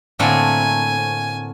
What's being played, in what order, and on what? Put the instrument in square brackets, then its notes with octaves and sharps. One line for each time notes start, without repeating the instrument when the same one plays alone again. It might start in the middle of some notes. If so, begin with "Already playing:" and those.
[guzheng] A2 C4 [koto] D3 A3 A#3 [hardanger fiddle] G#5